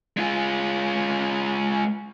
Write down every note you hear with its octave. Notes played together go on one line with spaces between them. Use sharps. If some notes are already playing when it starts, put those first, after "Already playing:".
G#3 F4